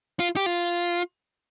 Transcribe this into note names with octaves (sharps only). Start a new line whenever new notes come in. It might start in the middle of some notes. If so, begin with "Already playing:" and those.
F4
G4
F4